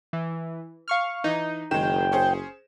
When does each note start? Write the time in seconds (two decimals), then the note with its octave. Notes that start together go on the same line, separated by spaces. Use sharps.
0.13 E3
0.88 F5 C#6 F6
1.24 E3 D#4
1.71 F#1 D#3 G#3 G5 E7
2.12 C#4 G#4 C5